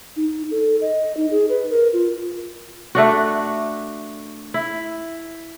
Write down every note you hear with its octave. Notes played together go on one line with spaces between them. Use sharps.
D#4
A4
D#5
D#4
G#4
B4
A#4
F4
A3 D4 F#4
E4